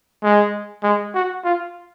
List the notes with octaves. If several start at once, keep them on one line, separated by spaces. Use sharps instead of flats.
G#3
G#3
F#4
F4